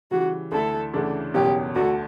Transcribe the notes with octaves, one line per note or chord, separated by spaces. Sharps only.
C#3 E3 G3 F#4
D2 D3 A3 E4 A4
D2 C#3 E3 A3 D4
F#1 E2 B2 G3 C#4 G4
D2 D3 A3 F#4